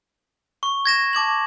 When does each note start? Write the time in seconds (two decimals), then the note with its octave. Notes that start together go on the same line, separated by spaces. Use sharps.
0.63 C#6
0.86 G#6 A#6 E7
1.13 A5 D6 G#6 F#7